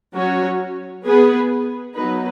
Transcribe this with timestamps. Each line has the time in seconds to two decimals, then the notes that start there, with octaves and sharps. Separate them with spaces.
0.14 F#3 C#4 F#4 C#5
1.04 B3 G#4 B4
1.96 F#3 B3 D#4 B4